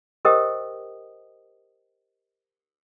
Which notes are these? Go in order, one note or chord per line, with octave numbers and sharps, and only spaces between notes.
G4 A#4 C5 D#5 G5 D#6